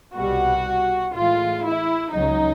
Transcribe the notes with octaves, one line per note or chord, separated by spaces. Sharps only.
C2 B2 G3 F#4
A2 E3 G#3 F4
E4
C#2 C#3 F#3 D#4